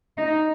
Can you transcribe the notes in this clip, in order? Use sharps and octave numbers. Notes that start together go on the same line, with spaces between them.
D#4